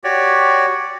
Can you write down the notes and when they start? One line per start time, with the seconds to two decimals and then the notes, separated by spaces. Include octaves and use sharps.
0.04 F#4 G4 C#5 D5